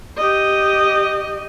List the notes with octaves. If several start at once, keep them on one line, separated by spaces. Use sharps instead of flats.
G4 D#5